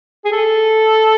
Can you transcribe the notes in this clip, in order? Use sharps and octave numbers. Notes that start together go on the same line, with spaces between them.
G#4
A4